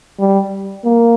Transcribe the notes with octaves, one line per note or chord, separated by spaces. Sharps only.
G3
A#3